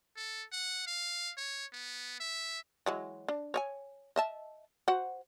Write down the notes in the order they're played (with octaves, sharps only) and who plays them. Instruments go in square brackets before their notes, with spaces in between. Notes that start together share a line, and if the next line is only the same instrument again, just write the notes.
[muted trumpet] A4
F#5
F5
C#5
B3
E5
[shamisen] E3 F#3 G#3
D4
C#5 D#5 G#5
D#5 E5 A5
F#4 C5 F#5